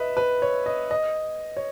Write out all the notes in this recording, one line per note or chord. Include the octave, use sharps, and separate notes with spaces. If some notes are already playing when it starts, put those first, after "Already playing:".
Already playing: B4 D#5 E5
B4
C#5
D#5
D#5
C#5